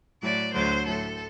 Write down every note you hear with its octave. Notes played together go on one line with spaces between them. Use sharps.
A2 F#3 D5
D2 D3 F#3 C5
A2 F#3 A4